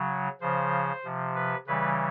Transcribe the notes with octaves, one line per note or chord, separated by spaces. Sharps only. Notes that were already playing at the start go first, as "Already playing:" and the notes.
Already playing: C#3 F#3
C#3 F3 C5
C3 F3
B4
C#3 E3 G3 B4